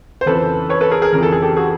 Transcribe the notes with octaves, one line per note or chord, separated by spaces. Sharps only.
C5
F2 C#3 E3 A4 B4
B4 C#5
A4 B4
G#4 A#4
G#4 A#4
F2 C#3 E3 A#4
A4
G#4
G4 A4
F#4 G#4